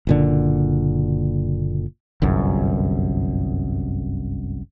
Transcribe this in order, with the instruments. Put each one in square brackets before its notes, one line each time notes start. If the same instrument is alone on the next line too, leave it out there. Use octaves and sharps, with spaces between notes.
[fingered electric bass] F#1 A#2 D3
[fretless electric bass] G1 C2 F#2